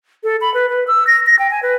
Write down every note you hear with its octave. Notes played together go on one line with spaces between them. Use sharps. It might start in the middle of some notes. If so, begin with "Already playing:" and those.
A4
B5
B4
B4
E6
A#6
A#6
G5
G#5
B4